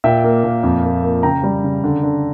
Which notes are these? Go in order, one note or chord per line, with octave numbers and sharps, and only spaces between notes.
A#2 E5 G5
A#3
A#2
F2
A#3
A#3
C#3 G5 A#5
G3
C#3
D3
D3